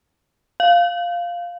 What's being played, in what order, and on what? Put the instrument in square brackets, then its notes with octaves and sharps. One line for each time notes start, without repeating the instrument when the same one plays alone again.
[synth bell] F5